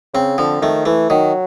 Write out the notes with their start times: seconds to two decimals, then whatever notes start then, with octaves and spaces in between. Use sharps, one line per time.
0.14 C#3 C4
0.38 D3 F3
0.62 D#3 A3
0.85 E3 A3
1.10 D#3 F#3